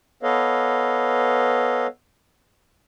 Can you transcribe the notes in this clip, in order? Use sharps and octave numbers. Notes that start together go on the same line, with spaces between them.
B3 A4 B4 C#5 D#5 F5